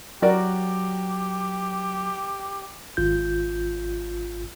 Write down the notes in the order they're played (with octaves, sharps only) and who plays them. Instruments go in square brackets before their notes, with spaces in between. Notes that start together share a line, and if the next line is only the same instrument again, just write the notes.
[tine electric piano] F#3 [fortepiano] F#4 A#4 D5 [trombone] G4
[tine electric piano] G#1 F4 G6